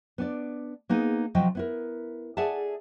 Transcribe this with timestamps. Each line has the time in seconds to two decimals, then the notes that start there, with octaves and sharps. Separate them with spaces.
0.18 B3 D4 D5
0.89 A#3 B3 D#4 G#4
1.35 C3 F3 F#3 D#5 G5
1.55 B3 E4 A#4
2.37 G#4 A4 D5 E5 F#5 A5